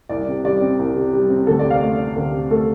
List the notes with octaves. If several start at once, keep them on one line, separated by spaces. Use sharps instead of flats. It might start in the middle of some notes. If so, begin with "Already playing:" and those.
C2 D5
C3
G3 D5
C4
C2
C3
G3
C4
D2 A4
D5
C3
F5
A3 D5
D4
D2
C3
A3 A4